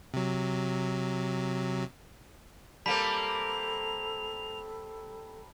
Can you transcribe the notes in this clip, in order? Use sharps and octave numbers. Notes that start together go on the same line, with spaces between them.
C3 F#3
G3 A#3 C4 A4 A5 B5 B6 F7